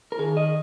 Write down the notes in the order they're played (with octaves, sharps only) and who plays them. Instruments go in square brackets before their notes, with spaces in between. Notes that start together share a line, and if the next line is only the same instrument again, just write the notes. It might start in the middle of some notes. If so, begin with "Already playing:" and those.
[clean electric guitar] A#4
D#3 G#4
D#5